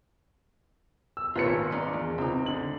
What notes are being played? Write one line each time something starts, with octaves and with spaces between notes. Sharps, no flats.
E6
G#1 A#2 F4 B4 C#5 C#7
A#3 D4 D#4
E2
C#2 C4 D#4
D3 F#7